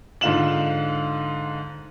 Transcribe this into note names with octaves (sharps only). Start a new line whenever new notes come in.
G#2 D3 F4 E7 F#7